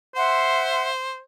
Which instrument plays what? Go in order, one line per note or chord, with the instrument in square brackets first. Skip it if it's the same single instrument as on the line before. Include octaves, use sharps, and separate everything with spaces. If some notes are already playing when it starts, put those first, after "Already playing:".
[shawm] C5 [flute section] E5 F#5 C6